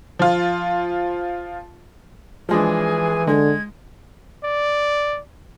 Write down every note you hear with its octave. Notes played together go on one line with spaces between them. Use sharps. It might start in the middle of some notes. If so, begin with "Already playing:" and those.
F3 F4
E3 F3 G#3 D4 G#4
D3 G#3 G#6
D5